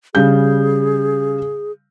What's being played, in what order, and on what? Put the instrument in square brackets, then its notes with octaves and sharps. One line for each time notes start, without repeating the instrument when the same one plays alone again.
[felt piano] C#3 G3 G6 [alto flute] G#4